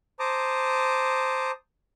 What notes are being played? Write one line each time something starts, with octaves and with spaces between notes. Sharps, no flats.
C5 A5 A#5 D6 D#6